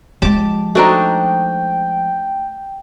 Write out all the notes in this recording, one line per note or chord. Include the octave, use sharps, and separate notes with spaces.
F3 G#3 G4 A5 D6
A3 D4 D#4 F#4 C5 G5 A#5